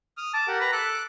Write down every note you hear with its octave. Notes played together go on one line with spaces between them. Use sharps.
D#6 F6
A5 D6
G4 A#4 F#5
B4 A#5
A4 D6 F#6